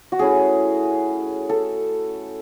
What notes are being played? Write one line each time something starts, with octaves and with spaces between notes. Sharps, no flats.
F#4
A3 C#4 E4 G#4
A4